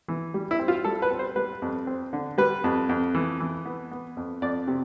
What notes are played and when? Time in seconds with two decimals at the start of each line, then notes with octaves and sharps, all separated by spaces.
0.08 E3
0.34 G3
0.51 E4
0.59 C4
0.68 F4
0.84 G3 A4
1.02 B4
1.11 C4
1.19 C5
1.36 G3 B4
1.62 F2
1.87 C4
2.13 D3
2.38 G3 B4
2.64 F2
2.89 F2
3.15 E3
3.40 E3
3.65 B3
3.92 B3
4.17 F2
4.42 F2 D5
4.68 C3